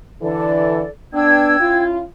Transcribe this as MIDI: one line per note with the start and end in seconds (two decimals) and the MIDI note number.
0.22 0.82 50
0.22 0.82 52
0.22 0.88 69
0.22 0.88 74
1.13 1.59 59
1.13 1.59 62
1.13 1.82 79
1.13 1.82 88
1.13 1.82 92
1.59 2.03 61
1.59 2.03 64
1.59 2.03 65